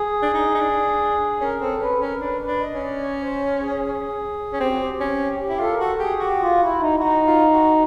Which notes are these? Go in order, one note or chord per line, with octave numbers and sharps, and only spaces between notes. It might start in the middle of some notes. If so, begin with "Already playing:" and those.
Already playing: G#4
D4
D#4
D#4
D4
C#4 A#4
C4 A4
C#4 B4
A4
C#4 A#4
D4 B4
B4
D4
D#5
C#4
D5
C#5
C5
G#4
C#4
C4 G4
F#4
G4
C#4
G4
E4
F4 A4
A#4
F#4 A4
G4 G#4
F#4 G4
F4
E4
D#4
E4
D#4 F#4
F4
F#4